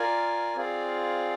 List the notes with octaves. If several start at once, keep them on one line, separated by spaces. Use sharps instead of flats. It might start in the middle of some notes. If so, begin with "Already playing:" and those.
Already playing: F4 A#4 D5 G#5
C4 F4 G#4 D5 F5